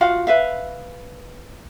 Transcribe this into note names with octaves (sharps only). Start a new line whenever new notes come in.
F4 F#4 F5 F#5
B4 E5 F5